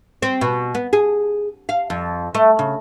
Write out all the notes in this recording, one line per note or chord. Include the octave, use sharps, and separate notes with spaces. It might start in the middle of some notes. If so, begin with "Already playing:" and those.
C4
B2
B3
G#4
F5
F2
A3
C#3